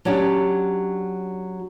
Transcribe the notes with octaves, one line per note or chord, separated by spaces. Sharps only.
F#3 C#4 D4 G4